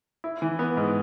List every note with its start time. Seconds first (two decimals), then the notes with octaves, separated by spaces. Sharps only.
0.24 E4
0.42 E3
0.59 B3
0.77 G#2